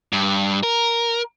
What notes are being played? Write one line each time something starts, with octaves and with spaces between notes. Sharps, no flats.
G2
A#4